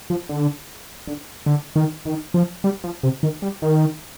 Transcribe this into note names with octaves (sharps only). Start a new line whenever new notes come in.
F3
D3
D3
D3
D#3
D#3
F3
G3
F3
C3
D#3
G3
D#3